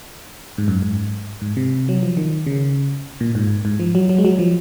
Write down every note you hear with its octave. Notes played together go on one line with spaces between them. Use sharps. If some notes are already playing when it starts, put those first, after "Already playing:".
G#2
F#2
G#2
G#2
C3
F#3
F3
D#3
C#3
A#2
G#2
G#2
F3
F#3
F#3
G#3
F#3
F3